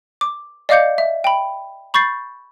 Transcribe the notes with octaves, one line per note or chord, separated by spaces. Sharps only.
D6
D5 D#5 F5 D6 G6 C#7
E5
G5 B5
B5 C#6 G6 A6 C7